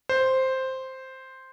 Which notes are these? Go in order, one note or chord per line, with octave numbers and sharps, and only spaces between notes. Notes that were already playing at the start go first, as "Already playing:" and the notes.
C5